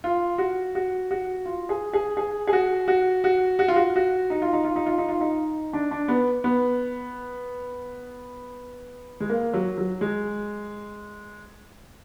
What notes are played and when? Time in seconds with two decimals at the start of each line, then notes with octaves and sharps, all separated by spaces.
0.04 F4
0.38 F#4
0.75 F#4
1.11 F#4
1.45 F4
1.69 G#4
1.93 G#4
2.17 G#4
2.47 G#4
2.53 F#4
2.88 F#4
3.24 F#4
3.59 F#4
3.68 F4
3.76 F#4
3.96 F#4
4.30 D#4
4.42 F4
4.53 D#4
4.65 F4
4.76 D#4
4.86 F4
4.98 D#4
5.09 F4
5.21 D#4
5.73 D4
5.91 D4
6.08 B3
6.44 B3
9.20 G#3
9.29 A#3
9.54 F#3
9.78 F#3
10.01 G#3